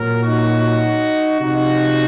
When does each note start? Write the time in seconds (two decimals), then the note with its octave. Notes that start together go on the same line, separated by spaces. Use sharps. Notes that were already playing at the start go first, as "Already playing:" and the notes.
Already playing: A#2 F#3 A#4
0.23 D#4 F#4
1.40 C3 F3 D#4 F#4